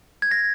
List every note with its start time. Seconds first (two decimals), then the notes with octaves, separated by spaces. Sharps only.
0.22 G#6
0.31 A#6